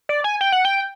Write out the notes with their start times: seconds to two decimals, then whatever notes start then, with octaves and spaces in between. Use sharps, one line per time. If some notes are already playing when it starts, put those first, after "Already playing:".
0.09 D5
0.24 G#5
0.41 G5
0.52 F#5
0.65 G5